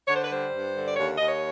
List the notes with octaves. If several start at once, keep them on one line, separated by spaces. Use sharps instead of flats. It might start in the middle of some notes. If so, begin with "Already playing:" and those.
D3 C#5
C5
B4
G3 C5
G2
D3
D5
D#2 C#5
D#2 D#5
C#5